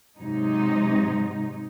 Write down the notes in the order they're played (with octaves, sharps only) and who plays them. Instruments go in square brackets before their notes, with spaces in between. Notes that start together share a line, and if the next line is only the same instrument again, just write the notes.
[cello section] G#2 C3 F#3 D#4